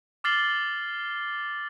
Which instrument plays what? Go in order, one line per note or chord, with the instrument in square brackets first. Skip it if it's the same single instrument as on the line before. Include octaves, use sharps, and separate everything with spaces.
[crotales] D6 F6 A6 C7 F#7 G7